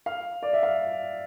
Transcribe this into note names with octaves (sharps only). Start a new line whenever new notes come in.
F5
D5
E5
F5